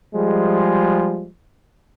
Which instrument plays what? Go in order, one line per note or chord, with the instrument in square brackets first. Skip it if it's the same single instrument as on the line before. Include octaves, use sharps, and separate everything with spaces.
[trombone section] F3 G3 G#3